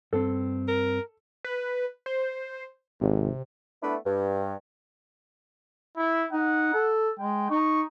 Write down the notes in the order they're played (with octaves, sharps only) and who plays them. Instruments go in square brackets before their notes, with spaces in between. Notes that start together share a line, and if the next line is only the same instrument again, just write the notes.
[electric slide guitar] G2 C4 [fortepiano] A4
[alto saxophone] A#4
[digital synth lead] B4
C5
[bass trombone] G#1 [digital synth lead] C3
[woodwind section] A3 B3 D4 E4 B4
G2
[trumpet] E4
[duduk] D#4 [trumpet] F#5
[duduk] A4
[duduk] G#3 [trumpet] G5
[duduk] D#4 [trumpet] C#6